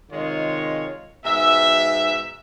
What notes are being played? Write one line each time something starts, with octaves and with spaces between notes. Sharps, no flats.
C3 D#3 G#3 F4 C#5
G#2 B2 E5